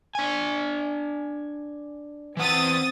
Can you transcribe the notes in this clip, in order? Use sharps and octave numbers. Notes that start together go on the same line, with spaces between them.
D4 G#5
E3 C4 B4 F#5 D#6 A6